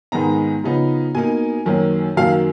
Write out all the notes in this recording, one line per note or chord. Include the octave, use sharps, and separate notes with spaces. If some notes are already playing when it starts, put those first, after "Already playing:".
G#2 D#3 G#3 B3 D#4 A#5
C#3 F3 B3 D#4
B2 A#3 D#4 G#5
F#2 D#3 F#3 A#3 C#4
F#2 D#3 F#3 A#3 F5